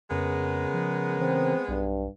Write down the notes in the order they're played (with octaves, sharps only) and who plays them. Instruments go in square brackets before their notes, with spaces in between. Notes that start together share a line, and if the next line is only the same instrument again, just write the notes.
[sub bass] F2 [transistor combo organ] C#3 A#4 [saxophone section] G#3 B3
[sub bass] F3
[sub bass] E3 [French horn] C4
[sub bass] B1 [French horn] G2